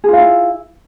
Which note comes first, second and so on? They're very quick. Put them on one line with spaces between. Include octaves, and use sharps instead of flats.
G#4 F4 F5 E4